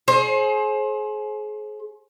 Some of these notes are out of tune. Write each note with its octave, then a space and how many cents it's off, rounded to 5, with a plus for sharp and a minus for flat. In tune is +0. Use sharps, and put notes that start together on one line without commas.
G#4 +35 C5 +35